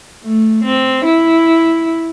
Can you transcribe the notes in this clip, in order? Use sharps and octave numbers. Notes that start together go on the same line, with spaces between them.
A3
C4
E4